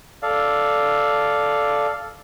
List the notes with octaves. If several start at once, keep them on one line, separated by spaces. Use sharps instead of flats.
A4 D5 F5